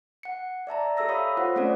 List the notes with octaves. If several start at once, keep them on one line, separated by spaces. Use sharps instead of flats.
F#5 C#7
D5 E5 A5 A#5
G4 A4 E5 E6 A#6
C#5 F5 B5 D#6
F4 C5 C#5 F#5
A3 C4 C#4 A4 D5